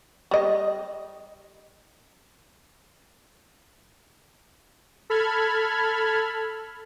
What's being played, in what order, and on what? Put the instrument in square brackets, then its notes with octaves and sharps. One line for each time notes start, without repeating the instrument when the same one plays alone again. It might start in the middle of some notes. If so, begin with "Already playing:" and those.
[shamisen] G3 D#5
[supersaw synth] A4 B5 F6 G#6